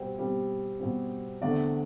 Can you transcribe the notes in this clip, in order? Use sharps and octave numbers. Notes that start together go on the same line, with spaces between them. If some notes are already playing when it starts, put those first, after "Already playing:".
Already playing: B2 G3 C4
B2 G3 C4
B2 G3 C4
E2 D3 A3 C4 D5